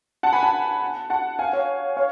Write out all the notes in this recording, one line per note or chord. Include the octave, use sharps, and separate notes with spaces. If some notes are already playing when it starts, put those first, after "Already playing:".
F#5 A5
G#5 B5
F#5 A5
F#5 A5
F5 G#5
F#5
C#5 F5
C#5 F5